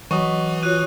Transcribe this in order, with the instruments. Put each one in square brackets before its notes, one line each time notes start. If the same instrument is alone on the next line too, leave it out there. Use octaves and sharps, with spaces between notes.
[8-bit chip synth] E3 [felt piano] F#3 [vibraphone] D#5 [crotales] C#6 D#6
[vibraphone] F4 F#4 C#5 [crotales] F#6 D#7